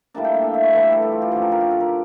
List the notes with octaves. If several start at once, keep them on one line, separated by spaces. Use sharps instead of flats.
A2 G3 A#3 D4 A5
G5
F5
E5
E5
C#5
A2 E3 G3 A4
G4
A4
G4
F4
G4
D3 F3 C#4 A4
A#4
A#4
G4
A4
A#4